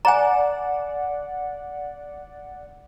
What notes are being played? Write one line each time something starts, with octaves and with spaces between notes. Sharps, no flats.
D5 F#5 G#5 A#5